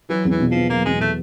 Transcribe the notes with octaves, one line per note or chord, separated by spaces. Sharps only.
E3 F#3
E2
E3
B2
F3 B3
F#3 A#3
E2 G#3
B2 A3